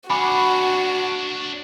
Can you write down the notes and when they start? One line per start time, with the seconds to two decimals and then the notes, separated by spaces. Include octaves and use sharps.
0.10 D4 F#4 C#5 G#5 B5 D6